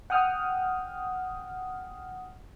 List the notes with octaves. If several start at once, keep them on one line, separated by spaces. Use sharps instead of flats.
F#5 G5 D#6 F6